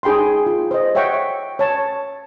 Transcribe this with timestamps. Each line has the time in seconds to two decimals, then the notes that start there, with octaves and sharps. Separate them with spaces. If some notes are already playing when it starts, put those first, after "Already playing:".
0.03 D#4 G#4 G5 B5 C6
0.46 F4
0.71 C5 D#5
0.95 C#5 E5 F#5 G5 C#6
1.59 C#5 A5